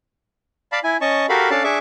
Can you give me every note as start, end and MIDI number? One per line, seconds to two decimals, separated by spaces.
0.72 0.79 74
0.72 0.79 77
0.72 0.79 81
0.72 0.79 83
0.84 0.97 64
0.84 0.97 80
1.01 1.26 61
1.01 1.26 75
1.01 1.26 81
1.01 1.26 85
1.29 1.50 66
1.29 1.50 67
1.29 1.50 69
1.29 1.50 70
1.29 1.50 77
1.29 1.50 83
1.50 1.63 61
1.50 1.63 62
1.50 1.63 69
1.50 1.63 74
1.50 1.63 77
1.50 1.63 81
1.64 1.79 62
1.64 1.79 68
1.64 1.79 76
1.64 1.79 85
1.64 1.79 86